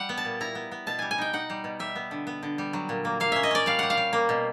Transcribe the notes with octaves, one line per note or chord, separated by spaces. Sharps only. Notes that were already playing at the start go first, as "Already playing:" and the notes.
Already playing: G3 F#5
B3
A5
A#2
E4 A#5
B3
B3
B2 A5
G3 G#5
G#5
D#4 G5
D#4 F#5
G3
B2
G3 E5
B3
D3
B3
D3
G3
F#3
A#2
A#3
A#3 F5
C#4 E5
D#5
C#4 D5
G3 F5
G3 F#5
F5
G3
A#3
B2